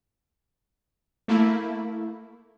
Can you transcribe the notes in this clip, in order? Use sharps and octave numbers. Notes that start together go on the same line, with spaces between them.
A3 A#3 E4